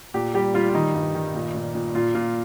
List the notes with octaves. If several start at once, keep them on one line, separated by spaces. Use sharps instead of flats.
A#2 G4
G3 G4
G3 F4
F4
D#3 D#4
G2
D#3
A#2
A#2
A#2
A#2 F4
A#2 F4